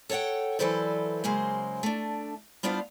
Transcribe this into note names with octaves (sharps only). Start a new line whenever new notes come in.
A4 C#5 D5 F#5 G5
E3 F#3 A4 B4 C5 D5
C#3 F#3 G#3 A#3 C5
A3 D4
G3 B3 D4 F4 C5 F5